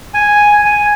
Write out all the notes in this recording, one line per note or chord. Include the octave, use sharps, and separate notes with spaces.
G#5
G#5